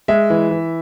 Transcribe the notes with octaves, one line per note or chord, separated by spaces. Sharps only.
G#3 E5
E3
E3